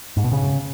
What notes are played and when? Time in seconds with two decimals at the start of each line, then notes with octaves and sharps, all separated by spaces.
0.17 G#2
0.24 B2
0.32 C#3